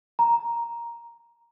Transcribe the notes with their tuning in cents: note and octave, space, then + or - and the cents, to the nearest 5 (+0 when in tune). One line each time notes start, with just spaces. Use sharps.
A#5 +5